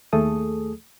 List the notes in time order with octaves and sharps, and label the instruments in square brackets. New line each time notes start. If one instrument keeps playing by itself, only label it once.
[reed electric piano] D#2 A3 G#4 A4 D#6